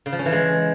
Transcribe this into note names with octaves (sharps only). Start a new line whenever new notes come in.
C#3
F3
C#4
E3
G#3